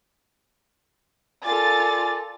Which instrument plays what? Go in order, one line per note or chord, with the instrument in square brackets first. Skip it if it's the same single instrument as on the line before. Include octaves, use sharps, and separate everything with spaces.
[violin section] F4 A6 [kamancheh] A4 A#4 [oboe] D5 [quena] G#5